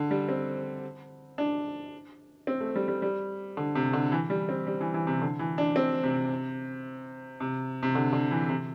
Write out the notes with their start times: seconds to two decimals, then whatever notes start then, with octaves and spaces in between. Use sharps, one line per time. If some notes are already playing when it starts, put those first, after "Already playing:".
Already playing: D3
0.11 G3
0.29 C4
1.38 D4
2.47 C4
2.61 A3
2.76 G3
2.88 G3
3.02 G3
3.57 D3
3.75 C3
3.93 D3
4.12 E3
4.30 G3
4.49 C4
4.67 G3
4.81 E3
4.94 E3
5.07 C3
5.22 D3
5.39 E3
5.58 D4
5.76 C4
6.04 C3
7.40 C3
7.83 C3
7.95 D3
8.13 D3
8.31 E3
8.49 C3